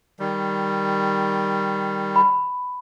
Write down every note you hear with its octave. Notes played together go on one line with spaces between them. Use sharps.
D#3 G3
B5